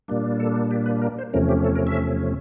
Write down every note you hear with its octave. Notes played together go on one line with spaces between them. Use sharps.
A#2 G3 A#3 D4
A4
G4
B4
A#4
C5
E2 C3 F3 A3 C#4 A#4
G4
A4
A#4
E5